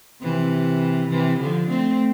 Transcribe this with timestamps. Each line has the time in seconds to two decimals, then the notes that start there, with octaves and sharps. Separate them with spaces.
0.22 C3 E3
1.10 C3 E3
1.40 D3 F3
1.69 A3 C4